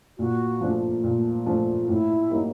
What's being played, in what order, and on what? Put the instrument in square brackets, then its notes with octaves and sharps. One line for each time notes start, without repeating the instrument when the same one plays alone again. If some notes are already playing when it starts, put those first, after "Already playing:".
[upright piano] A#2 [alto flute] F#4
[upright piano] F3 A3 D4
A#2
F3 A3 D4
[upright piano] A2 [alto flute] E4
[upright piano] F#3 A#3 D#4 G4